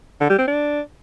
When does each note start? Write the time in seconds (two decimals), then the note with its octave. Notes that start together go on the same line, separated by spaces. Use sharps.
0.21 D3
0.30 G3
0.39 C4
0.48 D4